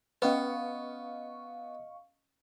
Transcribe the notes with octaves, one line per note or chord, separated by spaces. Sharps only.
B3 C#4 B4 D#5 F5 C#6